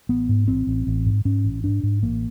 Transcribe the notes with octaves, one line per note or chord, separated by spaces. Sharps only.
A1 B3
G#2
A1 C4
A1
A1
G#2
G#2 C#4
A1
G#2 D4
G#2
A1 A#3